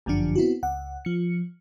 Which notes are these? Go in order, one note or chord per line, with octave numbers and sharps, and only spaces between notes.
G1 F#2 D3 F3 D4 C#7
B3 C4 E4 F#4
C#2 F#5
F3 C#7